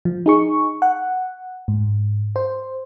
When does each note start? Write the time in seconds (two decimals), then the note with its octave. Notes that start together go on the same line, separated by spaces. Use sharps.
0.05 F3
0.26 D#4 G#4 C#6
0.82 F#5
1.68 G#2
2.36 C5